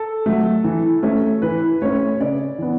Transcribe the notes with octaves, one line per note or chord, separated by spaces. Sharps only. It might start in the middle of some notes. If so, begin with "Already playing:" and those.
Already playing: A4
F#3 A3
E3
A3 C#4
E3 B4
A3 C#4 C#5
C#3 D5
E3 B3